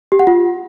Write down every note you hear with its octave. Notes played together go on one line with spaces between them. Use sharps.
G4
F#5
F4